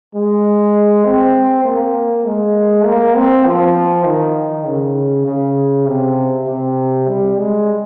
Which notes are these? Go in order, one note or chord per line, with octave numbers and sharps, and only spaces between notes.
G#3
C4
A#3
G#3
A#3
C4
F3
D#3
C#3
C#3
C3
C3
G3
G#3